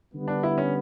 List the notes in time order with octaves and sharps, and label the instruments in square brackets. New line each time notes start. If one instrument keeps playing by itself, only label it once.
[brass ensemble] D3 G3 B3
[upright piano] D4
E4
C#4